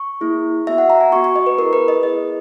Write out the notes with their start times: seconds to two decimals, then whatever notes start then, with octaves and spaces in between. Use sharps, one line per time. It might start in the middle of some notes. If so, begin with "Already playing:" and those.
Already playing: C#6
0.21 A#3 E4 G#4
0.67 B3 F#4 E5
0.78 F#5
0.90 A#5
1.01 G#5
1.12 B3 F#4 C#6
1.24 C#6
1.36 D#5
1.46 B4
1.58 B3 E4 G#4 A#4
1.73 B4
1.88 D#5
2.03 B3 E4 G#4 D#5